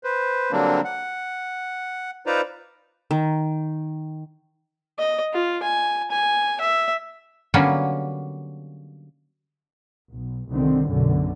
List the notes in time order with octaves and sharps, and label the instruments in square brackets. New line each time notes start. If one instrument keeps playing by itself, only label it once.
[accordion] B4 C5
D3 F#3 G3 A#3 C4 D4
F#5
D#4 F4 B4 C5 D5 A#5
[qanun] D#3
[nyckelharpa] D#5
F4
G#5
G#5
E5
[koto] D3 F#3 G3 A#3 B3 C#4
[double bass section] B1
C2 D3 D#3 C4
B1 F#2 B2 D3